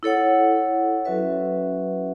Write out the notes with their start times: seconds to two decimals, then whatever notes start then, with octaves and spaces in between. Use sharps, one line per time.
0.03 E4 A4 C#5 F#5
1.05 F#3 C#4 F#4 B4 E5